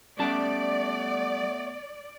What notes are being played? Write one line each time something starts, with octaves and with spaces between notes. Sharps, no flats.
G3 A3 B3 C#4 D5 A5